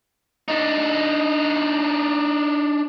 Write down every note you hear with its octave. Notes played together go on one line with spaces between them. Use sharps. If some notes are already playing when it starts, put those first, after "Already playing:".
D4 D#4